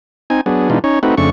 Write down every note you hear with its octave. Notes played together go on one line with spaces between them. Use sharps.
C4 D#4 G#5
F#3 B3 D4 G#4
B2 E3 G#3 D4 D#4 F4
C#4 D#4 C#5
A3 C4 D#4 F#4 B4
F2 C#3 A3 D4 C#6